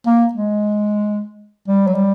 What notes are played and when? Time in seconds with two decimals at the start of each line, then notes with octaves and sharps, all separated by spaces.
0.06 A#3
0.33 G#3
1.68 G3
1.87 F#3
1.95 G3